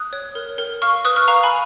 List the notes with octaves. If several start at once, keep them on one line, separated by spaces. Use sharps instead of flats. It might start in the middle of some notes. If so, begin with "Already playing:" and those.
Already playing: D#6 F#6
C#5
A#4
A#4
F5 C#6 F6
B4 D#6 F#6
C#6 F6
F5 A#5 C#6
G#5 B5